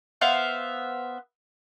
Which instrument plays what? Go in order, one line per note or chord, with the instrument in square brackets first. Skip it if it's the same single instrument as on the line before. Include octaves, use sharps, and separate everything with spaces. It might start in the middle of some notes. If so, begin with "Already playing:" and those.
[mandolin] B3 C5 E5 F5